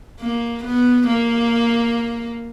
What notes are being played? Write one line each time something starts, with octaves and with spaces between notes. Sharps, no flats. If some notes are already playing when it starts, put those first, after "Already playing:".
A#3
B3
A#3